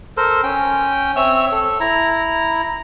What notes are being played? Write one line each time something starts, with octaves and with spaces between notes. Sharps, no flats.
A4 A#4 C5
C#4 G5
C4 C#5 E5 E6
A4
E4 A#5